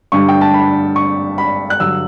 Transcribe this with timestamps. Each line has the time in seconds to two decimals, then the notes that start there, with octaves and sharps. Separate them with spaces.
0.12 G2 D3 G3 C#6
0.28 G5
0.41 A5
0.54 B5
0.96 C#6
1.38 B5
1.70 F#6
1.80 G2 D3 F#3 E6